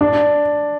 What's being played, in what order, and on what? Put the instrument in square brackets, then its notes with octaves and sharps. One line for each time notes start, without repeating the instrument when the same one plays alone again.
[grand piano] D4